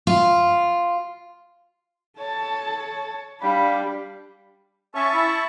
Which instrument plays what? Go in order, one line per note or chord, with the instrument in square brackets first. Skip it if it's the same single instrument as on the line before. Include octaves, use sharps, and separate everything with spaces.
[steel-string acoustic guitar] F4
[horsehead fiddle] A4 A5 [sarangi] C#5
[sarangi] G3 [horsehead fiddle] D4 [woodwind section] F5 B5
[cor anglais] C#4 [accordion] E5 A5 C#6
[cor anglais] E4